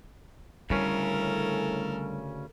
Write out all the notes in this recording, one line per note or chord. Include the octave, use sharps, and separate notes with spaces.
D2 A2 C#3 G3 C#4 A4 A#4